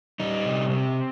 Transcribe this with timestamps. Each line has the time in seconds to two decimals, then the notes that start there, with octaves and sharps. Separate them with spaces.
0.20 G3 D#4
0.45 C3
0.70 C4